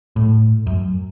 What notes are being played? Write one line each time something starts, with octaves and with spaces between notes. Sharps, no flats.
A2
F#2